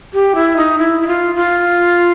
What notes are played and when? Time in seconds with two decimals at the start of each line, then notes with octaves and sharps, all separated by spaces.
0.13 G4
0.35 E4
0.57 D#4
0.79 E4
1.01 E4
1.07 F4
1.36 F4